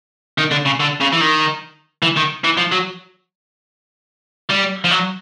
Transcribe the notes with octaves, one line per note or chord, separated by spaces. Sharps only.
D#3
D3
C#3
D3
C#3
E3
D#3
E3
D#3
E3
F3
F#3
G3
F3
F#3